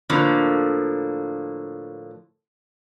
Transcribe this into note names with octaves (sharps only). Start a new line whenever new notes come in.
A2 D3 F3 A#3